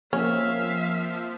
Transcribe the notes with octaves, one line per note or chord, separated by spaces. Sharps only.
F3 A#3 C4 C#4 E5 F5